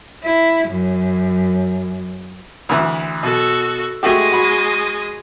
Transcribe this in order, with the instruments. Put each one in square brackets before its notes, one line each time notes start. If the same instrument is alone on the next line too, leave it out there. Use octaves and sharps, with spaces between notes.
[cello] E4
F#2
[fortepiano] D2 E3
[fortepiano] B2 [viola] F#4 A4
[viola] G#3 D#5 [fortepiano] A3 F#4 G4
[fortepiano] F#4 B5